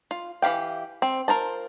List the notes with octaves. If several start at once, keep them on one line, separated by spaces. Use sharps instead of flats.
F4
E3 G4 F5 G5
C4
F4 A#4 C5 A5